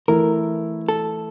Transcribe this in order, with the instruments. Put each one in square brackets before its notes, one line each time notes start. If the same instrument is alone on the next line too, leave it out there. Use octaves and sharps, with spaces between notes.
[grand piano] E3 A3 E4 [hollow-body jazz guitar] A#4
[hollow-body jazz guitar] A4